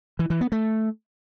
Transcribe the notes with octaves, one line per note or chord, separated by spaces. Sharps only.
E3
E3
B3
A3